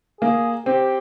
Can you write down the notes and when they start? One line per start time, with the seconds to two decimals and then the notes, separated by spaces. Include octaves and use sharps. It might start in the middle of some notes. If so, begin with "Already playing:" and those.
0.21 A#3 G#4
0.66 C4 G4